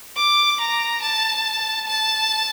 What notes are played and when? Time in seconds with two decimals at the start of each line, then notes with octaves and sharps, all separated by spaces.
0.17 D6
0.60 A#5
1.02 A5
1.87 A5